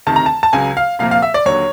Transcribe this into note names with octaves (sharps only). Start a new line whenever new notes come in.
D2 C3 D#3 A5
A#5
A5
A5
C#2 C#3 F#3 G#5
F5
C2 A#2 F3 A#3 F5
F5
E5
D5
D#2 D3 F#3 C#5